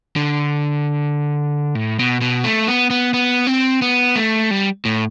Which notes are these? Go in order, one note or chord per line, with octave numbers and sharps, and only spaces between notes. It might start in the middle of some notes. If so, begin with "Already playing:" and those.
D3
A2
B2
B2
A3
B3
B3
B3
C4
B3
A3
G3
A2